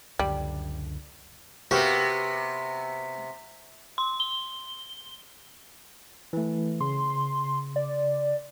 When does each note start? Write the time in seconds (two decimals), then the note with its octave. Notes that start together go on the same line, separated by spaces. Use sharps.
0.19 C#2 F#2 D3 G3
1.71 C3 B3 F#4 G4 A#4
3.98 C6
4.20 G7
6.33 E3 A3
6.81 C#3 C6
7.76 D5